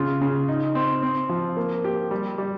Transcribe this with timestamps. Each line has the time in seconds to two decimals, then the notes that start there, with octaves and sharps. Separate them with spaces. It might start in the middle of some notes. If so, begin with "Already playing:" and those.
Already playing: C#3 F4
0.21 C#3
0.48 D#4
0.75 C4
1.03 C4
1.29 F3
1.57 A#3
1.84 G4
2.11 G3
2.38 G3